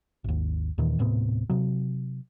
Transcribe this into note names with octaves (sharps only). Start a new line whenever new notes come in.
G#1 D#2
D#2 A#2 D#3 E3
D#1 A2 C3 B3
C3 F#3